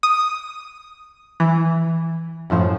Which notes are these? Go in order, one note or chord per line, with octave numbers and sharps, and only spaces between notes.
D#6
E3
F#2 A2 F3